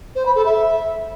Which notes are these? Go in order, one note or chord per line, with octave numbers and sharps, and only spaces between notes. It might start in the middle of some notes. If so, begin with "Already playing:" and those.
C5
B5
A4
E5